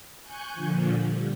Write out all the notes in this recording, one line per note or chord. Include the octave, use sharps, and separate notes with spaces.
G#5 C#6 F#6 G6
A#2 D3 F3
G3